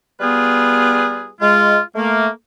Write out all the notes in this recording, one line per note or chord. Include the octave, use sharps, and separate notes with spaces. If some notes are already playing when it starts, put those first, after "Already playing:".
G3 B3 F4 G#4 B4
G#3 F4
A3 A#3